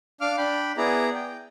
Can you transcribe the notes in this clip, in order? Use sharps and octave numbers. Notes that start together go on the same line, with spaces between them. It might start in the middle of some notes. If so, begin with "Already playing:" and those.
D4 F5 D6 F6
D4 G5 B5
B3 E4 G#4 D5 A#5
G5